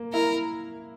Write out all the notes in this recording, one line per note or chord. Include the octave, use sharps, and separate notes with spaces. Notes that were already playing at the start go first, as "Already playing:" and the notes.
Already playing: A#3
E4 A#4